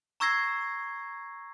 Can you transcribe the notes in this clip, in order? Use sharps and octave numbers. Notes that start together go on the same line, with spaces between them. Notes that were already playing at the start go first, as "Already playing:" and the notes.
A#5 C#6 E6 G#6 A#6 C7